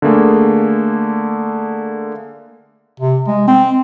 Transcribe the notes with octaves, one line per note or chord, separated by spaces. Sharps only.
D3 A3 A#3 G#4
C3
G#3
C4